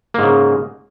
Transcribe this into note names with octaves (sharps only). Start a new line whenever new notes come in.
G#2 C#3 A#3